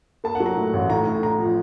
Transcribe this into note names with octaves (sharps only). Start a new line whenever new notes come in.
A#3 A5
F#5
F#3
A#5
A2
A1
A2 A#5
A2
A2 A#5
F3